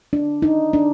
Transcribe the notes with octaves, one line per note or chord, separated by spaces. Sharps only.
D4
D#4
D4